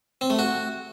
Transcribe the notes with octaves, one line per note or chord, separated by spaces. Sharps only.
C4
A3
F#4